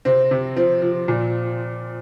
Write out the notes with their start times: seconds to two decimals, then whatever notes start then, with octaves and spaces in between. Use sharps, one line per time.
0.05 C3 C4
0.31 C3
0.56 F3 C4
0.82 F3
1.08 A#2